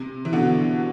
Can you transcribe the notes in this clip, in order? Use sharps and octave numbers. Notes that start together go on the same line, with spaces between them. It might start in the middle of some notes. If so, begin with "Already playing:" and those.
Already playing: C3
E3
B2 D3